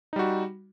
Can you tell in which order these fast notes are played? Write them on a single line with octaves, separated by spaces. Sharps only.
D#4 G3 F#4